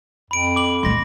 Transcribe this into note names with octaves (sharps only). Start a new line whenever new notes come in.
F2 B5 D7
D6 F#7
A#2 A3 C6 A#6